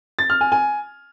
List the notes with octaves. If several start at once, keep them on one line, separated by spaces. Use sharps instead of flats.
A6
F6
G#5
G#5